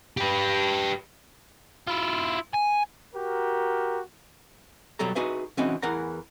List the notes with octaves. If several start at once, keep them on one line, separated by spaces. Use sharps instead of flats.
G4 B4
E4 F4
G#5
F#4 G4 A#4
B2 F#3 G3 A4 A#5
D#4 F#4 G#4 B4 E5
E3 C4 C#4 D#4 F#4
E2 E3 A#4 F#5 A#5